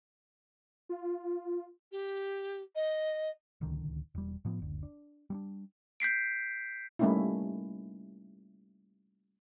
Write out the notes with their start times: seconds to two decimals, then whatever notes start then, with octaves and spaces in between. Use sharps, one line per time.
0.89 F4
1.92 G4
2.75 D#5
3.61 D1 C#2 D3 D#3
4.15 E1 G3
4.45 A2 F3 B3
4.59 F#1 D2
4.83 D4
5.30 G3 B3 D4
6.00 G6 B6 C7 D7
6.99 G3 A3 A#3 C#4 D#4 E4